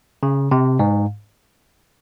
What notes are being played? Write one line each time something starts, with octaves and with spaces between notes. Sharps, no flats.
C#3
C3
G#2